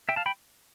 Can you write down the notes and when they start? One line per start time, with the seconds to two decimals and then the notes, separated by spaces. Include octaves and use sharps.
0.09 E5 G5
0.16 F5 A5
0.26 G5 B5